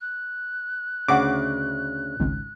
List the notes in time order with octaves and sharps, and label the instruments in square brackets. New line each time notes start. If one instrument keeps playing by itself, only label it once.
[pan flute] F#6
[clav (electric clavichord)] D2 C#3 [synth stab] F#5 D6
[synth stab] G#1 C#2